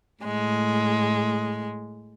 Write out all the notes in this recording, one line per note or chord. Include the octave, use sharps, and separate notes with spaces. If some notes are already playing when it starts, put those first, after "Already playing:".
A2 G#3